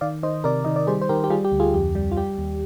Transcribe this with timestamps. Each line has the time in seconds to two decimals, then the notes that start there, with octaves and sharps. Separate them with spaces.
0.01 D#3 D5 F5
0.23 D#3 C5 D#5
0.44 C3 A#4 D5
0.65 D#3 D#5
0.76 D5
0.87 G3 G#4 C5
1.02 C5
1.09 D#3 G4 A#4
1.24 G4
1.30 G3 F4 G#4
1.44 G4
1.52 D2
1.60 F4 G#4
1.74 F2 G4
1.95 G3
2.11 F4
2.17 G3 G4
2.38 D#2